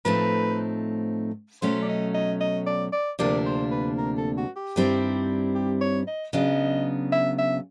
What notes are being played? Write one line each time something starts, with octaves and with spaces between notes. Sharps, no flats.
A2 F3 A3 C4 D#4 B4
B2 F#3 A3 C#4 C5
D5
D#5
D#5
D#5
D5
D5
D2 C3 F3 A#3 D4 D5
C5
B4
A#4
A4
F#4
G4
G2 D#3 G3 C4 E4
G4
C#5
D#5
C#3 F#3 B3 D4 D#5
E5
E5